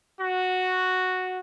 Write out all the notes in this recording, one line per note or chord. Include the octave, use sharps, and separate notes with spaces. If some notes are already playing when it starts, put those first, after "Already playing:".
F#4